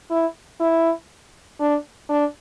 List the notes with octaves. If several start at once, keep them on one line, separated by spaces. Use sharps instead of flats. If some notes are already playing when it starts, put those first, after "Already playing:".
E4
E4
D4
D4